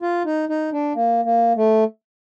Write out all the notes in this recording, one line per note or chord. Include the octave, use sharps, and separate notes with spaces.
F4
D#4
D#4
D4
A#3
A#3
A3